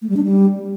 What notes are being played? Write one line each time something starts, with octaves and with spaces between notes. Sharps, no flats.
A3
G3
D4
G3